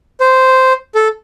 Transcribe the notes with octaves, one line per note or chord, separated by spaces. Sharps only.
C5
A4